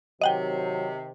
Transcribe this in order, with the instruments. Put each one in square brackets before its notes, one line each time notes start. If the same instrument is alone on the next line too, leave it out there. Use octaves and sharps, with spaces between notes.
[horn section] C3 D#3 [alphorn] F#3 [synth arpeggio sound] D#5 F#5 G5